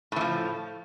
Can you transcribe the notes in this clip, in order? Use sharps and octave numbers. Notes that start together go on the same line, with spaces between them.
A2 E3 F3